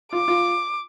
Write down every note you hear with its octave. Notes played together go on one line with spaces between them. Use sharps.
F4 D6
F4